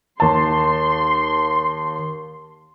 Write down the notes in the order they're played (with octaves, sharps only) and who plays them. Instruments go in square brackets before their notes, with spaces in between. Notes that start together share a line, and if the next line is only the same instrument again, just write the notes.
[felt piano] D#2 A5 [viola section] C6